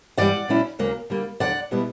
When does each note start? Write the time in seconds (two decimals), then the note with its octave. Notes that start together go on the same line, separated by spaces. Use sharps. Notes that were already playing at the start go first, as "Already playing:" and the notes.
0.17 G2 E3 G3 D5 F#5
0.48 A#2 F#3 C#4 E4
0.79 D2 C#3 F#3 A#3
1.10 D3 G3 A#3
1.40 D2 D3 F#3 D5 F#5
1.71 B2 G3 B3 E4